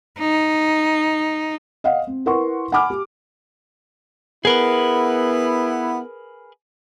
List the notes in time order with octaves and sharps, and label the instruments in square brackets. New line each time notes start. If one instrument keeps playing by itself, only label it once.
[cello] D#4
[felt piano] D#5 F5 F#5
C4
E4 A#4 B4 F#5 C6 C#6
F#5 G#5 B5 D6 F6
G4
[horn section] B3 E4 [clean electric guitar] G#4 A#4 B4